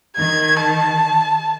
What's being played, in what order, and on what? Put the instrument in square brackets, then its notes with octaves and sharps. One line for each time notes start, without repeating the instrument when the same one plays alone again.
[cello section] D#3 [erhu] G#6
[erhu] A5